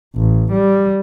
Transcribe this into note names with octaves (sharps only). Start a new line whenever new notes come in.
A1
G3